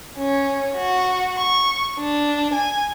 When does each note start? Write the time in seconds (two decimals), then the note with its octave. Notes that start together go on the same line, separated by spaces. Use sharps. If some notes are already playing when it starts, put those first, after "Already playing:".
0.17 C#4
0.76 F#4
1.37 C#6
1.99 D4
2.54 G#5